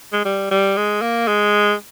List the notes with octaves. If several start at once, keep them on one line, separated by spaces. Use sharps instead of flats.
G#3
G3
G3
G#3
A#3
G#3